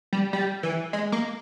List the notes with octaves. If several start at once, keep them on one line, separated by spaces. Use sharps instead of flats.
G3
G3
E3
G#3
A#3